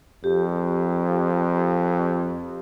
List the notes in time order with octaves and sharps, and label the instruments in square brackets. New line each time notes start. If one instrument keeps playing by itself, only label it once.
[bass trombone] F2 [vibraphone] G4